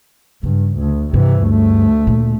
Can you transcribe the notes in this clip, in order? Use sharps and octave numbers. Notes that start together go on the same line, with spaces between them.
G2 C#3
D2
G2 C3 E3
D2 A3
A#2